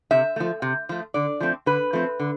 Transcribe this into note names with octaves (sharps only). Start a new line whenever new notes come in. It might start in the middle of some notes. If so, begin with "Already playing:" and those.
C3 E5
F3 A3
C3
F3 A3
D3 D5
F3 A3 C4
D3 B4
F3 A3 C4
D3